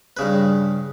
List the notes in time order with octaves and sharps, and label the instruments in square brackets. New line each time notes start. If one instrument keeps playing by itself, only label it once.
[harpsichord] G2 C#3 B4